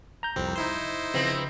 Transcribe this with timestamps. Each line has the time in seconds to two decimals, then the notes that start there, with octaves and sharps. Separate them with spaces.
0.23 A#5 G6
0.36 C2 F2 C4
0.56 D#4 E4 C5
1.14 C#3 F3 C4 B4